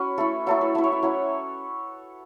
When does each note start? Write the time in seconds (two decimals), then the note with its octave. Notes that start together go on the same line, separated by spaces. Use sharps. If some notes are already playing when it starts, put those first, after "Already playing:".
Already playing: C#4 F#4 B4
0.18 A3 E4 A4
0.47 F#3 A3 E4 A4
0.61 B4
0.75 A3 E4 E5
0.84 C#5
0.92 E5
1.02 F#3 C#4 E4 F#5